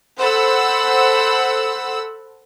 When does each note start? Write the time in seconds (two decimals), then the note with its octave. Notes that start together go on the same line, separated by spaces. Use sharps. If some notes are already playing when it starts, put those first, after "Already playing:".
0.17 A4 C5 F#5 B5 E6